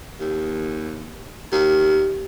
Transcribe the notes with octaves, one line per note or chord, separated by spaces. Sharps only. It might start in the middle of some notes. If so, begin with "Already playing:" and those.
D#2
D#2